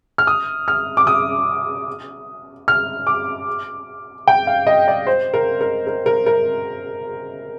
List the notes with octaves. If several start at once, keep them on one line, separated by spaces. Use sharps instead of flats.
F6
D#6
F6
D6
D#6
F6
D6
G5
F5
D#5
D5
C5
A#4
A#4
A#4
A#4
A#4